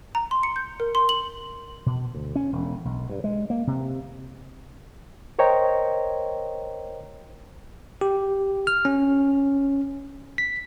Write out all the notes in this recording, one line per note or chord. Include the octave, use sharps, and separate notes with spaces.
A#5
C6
C#7
G6
A#4
C6
F#7
B2
D2
C#4
E1
B1
G2
G#3
A#3
C3
A#4 C5 C#5 D#5 G5 A#5
G4
F6
C#4
B6